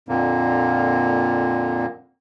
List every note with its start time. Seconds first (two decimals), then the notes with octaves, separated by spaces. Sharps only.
0.09 F2 A#2 D3 A#3